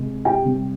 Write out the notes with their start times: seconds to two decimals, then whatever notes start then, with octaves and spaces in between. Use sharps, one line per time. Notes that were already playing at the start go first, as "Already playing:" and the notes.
Already playing: C3 G#3
0.25 G4 G5
0.45 C3 G3